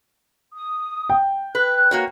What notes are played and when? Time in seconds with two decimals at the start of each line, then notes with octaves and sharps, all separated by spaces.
0.54 D#6
1.10 G5
1.55 B4 F#6
1.91 A#3 F#4 C#5